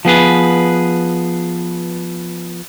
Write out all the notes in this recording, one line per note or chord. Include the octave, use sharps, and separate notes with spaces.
F3 B3 G#4 B4